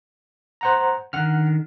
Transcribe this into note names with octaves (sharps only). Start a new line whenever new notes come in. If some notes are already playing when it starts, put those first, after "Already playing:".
C5 F#5 A#5
D3 D#3 F#5 F6